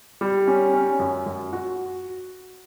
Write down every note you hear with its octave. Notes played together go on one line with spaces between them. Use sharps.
G3
C#4
C#4
F#2
F#2
F#4